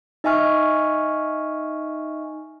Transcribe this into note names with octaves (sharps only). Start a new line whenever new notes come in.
D#4 D#5 E5 G#5 C#6 F6